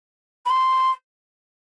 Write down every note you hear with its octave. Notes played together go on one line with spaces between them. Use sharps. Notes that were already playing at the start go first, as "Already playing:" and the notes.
B5
C6